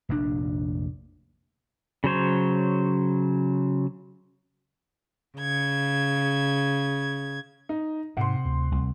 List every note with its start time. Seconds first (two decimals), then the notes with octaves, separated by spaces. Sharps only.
0.09 F1 A#1 A2 D4
2.04 C#3 F#3 C5 C#5
5.37 C#3 G#6
7.69 D#4
8.17 G#2 C3 F#5 C6
8.46 D2
8.72 C2